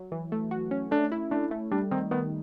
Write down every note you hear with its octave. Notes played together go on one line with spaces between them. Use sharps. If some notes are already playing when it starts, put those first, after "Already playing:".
Already playing: F#3
E3
A3
F#4
C#4
A3 D4
E4
A3 D4
A3
G3 D4
D#3 C4
D#3 B3